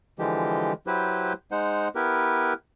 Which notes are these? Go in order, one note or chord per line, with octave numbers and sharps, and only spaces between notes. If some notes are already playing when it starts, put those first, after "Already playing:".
D3 E3 F3 G#3 G4
F#3 E4 G4 B4 C5
G#3 D#4 C5 F#5
B3 E4 G4 A#4 B4